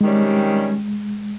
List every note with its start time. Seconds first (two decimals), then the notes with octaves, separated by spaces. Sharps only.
0.01 C3 D#3 G3 G#3 C#4